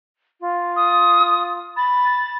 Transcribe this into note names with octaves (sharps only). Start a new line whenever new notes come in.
F4
D#6
B5 A6